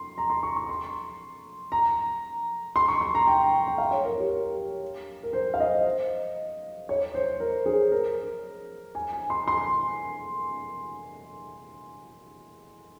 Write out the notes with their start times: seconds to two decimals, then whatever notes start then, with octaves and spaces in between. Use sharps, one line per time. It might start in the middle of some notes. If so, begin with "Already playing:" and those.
Already playing: C6
0.18 A#5
0.30 C6
0.43 C#6
0.56 C#6
0.69 C6
1.72 A#5
2.76 C6
2.88 C#6
3.01 C6
3.15 A#5
3.27 G5
3.68 G5
3.78 F5
3.91 C#5
4.05 A#4
4.18 G4
4.30 A#4
5.23 A#4
5.33 C5
5.54 F5
5.60 D#5
6.89 C#5
7.14 C5
7.40 A#4
7.66 G#4
7.92 A#4
8.95 G#5
9.13 G#5
9.30 C6
9.48 C6